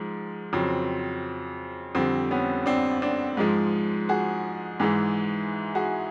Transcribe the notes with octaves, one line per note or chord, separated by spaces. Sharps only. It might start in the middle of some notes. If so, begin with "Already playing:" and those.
Already playing: G#2 F3 G#3
F2 C#3 F#3 C4
F2 D3 G3 C4
B3 C#4
C4 D4
C4 D4
G#2 F3 G#3
F#4 G#4
G#2 E3 G#3
F#4 G#4